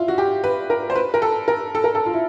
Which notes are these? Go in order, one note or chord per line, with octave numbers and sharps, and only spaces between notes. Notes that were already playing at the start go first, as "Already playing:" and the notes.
Already playing: E4 F4
F#4
G4
B4
A#4
C5
B4
A#4
A4
A#4
A4
A#4
A4
F4
E4